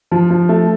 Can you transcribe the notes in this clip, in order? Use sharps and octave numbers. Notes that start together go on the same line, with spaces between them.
F3
F3
A3